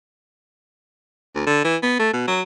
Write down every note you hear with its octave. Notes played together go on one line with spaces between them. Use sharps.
D2
D3
E3
B3
A3
B2
F#3